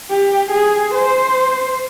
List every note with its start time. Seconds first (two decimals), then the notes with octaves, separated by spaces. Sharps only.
0.10 G4
0.51 G#4
0.94 C5